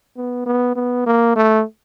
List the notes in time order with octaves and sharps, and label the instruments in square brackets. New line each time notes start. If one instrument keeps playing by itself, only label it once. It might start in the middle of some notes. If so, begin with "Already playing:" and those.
[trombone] B3
B3
B3
A#3
A3